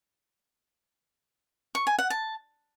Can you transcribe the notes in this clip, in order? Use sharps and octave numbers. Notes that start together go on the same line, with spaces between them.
C#6
G#5
F#5
A5